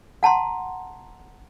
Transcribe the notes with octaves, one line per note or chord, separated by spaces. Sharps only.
F#5 A5 A#5 C6